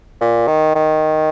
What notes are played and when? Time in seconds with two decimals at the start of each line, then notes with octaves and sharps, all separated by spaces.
0.21 A#2
0.47 D#3
0.75 D#3